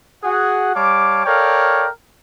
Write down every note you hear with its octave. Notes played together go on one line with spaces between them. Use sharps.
F#4 G#4 F#5
G3 C#5 F5 A5 D6
A4 A#4 C#5 D5 F5 G5